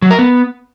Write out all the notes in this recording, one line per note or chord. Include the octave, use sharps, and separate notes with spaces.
F#3
A#4
B3